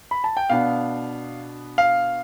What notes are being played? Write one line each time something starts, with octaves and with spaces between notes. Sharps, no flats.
B5
A5
G5
B2 B3 D4 F5
F5